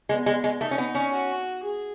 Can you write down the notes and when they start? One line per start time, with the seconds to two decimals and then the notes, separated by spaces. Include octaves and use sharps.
0.09 G#3 B3
0.26 G#3
0.44 G#3
0.61 A3 D#4
0.71 C#4
0.78 B3
0.95 C#4
1.12 F#4
1.63 G#4